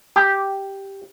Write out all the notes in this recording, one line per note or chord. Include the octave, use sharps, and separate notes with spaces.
G4